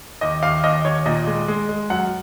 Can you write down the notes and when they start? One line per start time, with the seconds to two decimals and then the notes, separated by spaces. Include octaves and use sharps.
0.21 D#2 D#5
0.42 D#2 F5
0.63 D#2 D#5
0.85 D#2 C#5
1.06 A#2 D#5
1.27 G#3
1.48 G#3
1.69 G#3
1.90 F#2 F#5